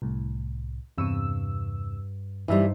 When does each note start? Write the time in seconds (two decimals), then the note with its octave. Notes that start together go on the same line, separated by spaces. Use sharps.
0.02 C2 A2
0.98 E2 G2 C3 C#6 E6 D#7
2.48 G2 E3 G3 D#4 E4 C5 E5